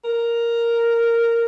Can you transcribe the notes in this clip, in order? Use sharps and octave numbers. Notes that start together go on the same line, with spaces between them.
A#4